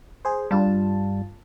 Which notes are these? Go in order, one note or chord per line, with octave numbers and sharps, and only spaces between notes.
G#4 C5
G2 G3 F4 A5